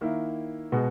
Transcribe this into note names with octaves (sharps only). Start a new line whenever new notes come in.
D#3 A#3 E4
B2 G#3 B3 F#4